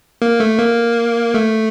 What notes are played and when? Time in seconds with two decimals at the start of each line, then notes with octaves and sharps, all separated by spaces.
0.22 A#3
0.40 A3
0.59 A#3
1.34 A3